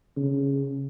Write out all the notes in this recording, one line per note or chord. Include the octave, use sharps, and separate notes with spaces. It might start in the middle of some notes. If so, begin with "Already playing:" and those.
C#3